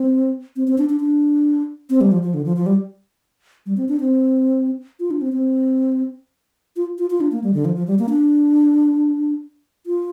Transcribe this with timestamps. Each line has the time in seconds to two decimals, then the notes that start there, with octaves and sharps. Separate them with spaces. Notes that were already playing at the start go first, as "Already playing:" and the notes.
Already playing: C4
0.56 C4
0.68 C4
0.78 D4
0.89 D4
1.00 D4
1.90 C4
2.01 G3
2.11 F3
2.23 F3
2.34 D3
2.45 F3
2.56 F3
2.66 G3
3.66 G3
3.77 C4
3.89 D4
4.00 C4
5.00 F4
5.11 D4
5.21 C4
5.33 C4
6.76 F4
6.99 F4
7.10 F4
7.21 D4
7.32 A#3
7.44 G3
7.54 D3
7.65 F3
7.76 F3
7.87 G3
7.99 A#3
8.10 D4
9.86 F4